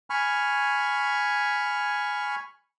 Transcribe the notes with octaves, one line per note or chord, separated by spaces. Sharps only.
G#5 B5 C#6 F6